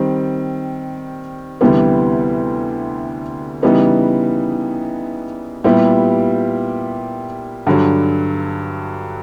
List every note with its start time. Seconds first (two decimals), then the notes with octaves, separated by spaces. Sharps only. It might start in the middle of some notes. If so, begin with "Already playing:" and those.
Already playing: D#3 G3 C4
1.61 D2 C3 E3 G3 B3
3.62 C#3 E3 G3 B3 D#4
5.64 A#2 G3 B3 E4 G4
7.67 G2 D3 F#3